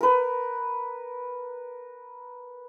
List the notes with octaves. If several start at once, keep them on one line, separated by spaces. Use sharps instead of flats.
A#4 B4